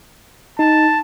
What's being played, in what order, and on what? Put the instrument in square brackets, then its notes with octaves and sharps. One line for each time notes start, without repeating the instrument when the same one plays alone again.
[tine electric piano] D#4 [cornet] A5